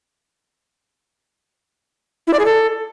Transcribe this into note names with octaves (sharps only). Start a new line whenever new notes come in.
E4
D5
G#4
A4